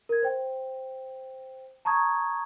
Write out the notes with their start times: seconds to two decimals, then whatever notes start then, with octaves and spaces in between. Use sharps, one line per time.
0.09 A#4 G#6
0.23 C5 G5
1.85 A5 A#5 C#6 D#6 G#6